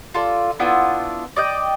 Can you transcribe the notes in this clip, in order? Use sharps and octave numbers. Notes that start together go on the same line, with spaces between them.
F4 A4 D5
B3 D4 E4 F4
D5 D#5 G5